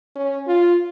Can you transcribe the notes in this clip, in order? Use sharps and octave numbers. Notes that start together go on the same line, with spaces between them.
C#4
F4